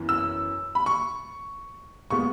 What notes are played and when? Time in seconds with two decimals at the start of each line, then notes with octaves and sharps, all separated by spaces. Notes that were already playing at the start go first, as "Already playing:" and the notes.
Already playing: F#2 E3 B3
0.09 E6
0.75 B5
0.86 C#6
2.10 A#2 G#3 B3 C#6